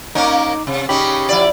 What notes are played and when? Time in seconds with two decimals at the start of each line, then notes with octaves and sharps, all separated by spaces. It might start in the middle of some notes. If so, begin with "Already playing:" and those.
0.15 A#3 C#4 D#4 A#4 D6
0.67 C3
0.89 C#3 C#4 D#4 G4 B5
1.29 F3 E4 D5